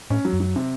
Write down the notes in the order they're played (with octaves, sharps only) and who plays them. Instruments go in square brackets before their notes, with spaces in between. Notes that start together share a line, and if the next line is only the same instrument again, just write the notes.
[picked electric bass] A2 [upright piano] C#4
[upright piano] F#3
[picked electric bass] F#2
[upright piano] F#3
C3